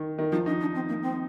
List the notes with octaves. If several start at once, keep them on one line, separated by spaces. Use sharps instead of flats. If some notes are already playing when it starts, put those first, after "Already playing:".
Already playing: D#3
D#3
F3 D#4
D4 D#4
D4
C4
A#3
C4